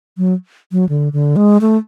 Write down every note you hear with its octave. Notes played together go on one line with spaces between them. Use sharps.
F#3
F#3
D3
D3
G#3
A3